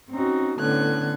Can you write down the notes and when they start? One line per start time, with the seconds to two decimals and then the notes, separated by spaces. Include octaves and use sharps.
0.10 C4 C#4 D#4 F#4
0.59 A2 D3 B3 C#4 F#6 G#6